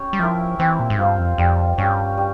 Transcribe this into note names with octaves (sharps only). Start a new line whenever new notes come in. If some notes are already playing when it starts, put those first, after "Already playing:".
Already playing: C#4 G4 C#5
G3
F3 E4 A#4 E5
E3 C4
A#2
G#2
G2 F4 C5 F5
F2
F2 G3
G2 C#4 G4
G3